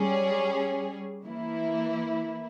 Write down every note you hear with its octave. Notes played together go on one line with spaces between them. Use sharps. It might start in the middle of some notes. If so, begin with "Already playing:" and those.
Already playing: G3 C#4 G#4
E3 A#3 E4